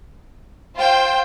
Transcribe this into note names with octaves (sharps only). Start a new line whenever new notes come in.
F4 C5 G5